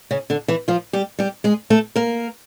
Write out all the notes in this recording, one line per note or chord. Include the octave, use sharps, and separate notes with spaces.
C#3 C#4
D3 D4
E3 E4
F3 F4
G3 G4
G3 G4
G#3 G#4
A3 A4
A#3 A#4